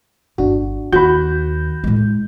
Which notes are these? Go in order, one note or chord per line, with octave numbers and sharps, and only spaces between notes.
G1 D4 F#4
D#2 F#4 B5 G6
A2 G#3